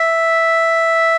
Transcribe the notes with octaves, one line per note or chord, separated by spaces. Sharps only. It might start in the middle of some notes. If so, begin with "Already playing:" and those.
Already playing: E5